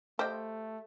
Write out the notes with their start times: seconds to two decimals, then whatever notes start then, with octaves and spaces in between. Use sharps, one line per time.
0.19 A3 G4 C5 D#5 F5 G5